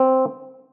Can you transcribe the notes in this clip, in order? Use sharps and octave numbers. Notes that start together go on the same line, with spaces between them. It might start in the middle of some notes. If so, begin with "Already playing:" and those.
Already playing: C4